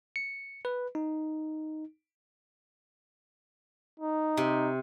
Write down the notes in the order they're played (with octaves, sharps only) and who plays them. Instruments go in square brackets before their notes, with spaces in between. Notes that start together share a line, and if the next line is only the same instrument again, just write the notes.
[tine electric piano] C#7
B4
D#4
[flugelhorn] D#4
[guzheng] C3